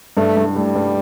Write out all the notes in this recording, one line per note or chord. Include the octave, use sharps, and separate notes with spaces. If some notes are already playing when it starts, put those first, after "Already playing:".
G2 A3
G2
G3 A3
G2